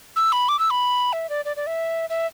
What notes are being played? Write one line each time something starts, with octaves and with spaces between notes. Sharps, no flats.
E6
B5
D6
E6
B5
E5
D5
D5
D5
E5
E5